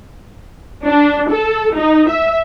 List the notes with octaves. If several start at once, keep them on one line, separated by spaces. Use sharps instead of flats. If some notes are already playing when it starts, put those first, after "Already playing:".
D4
A4
D#4
E5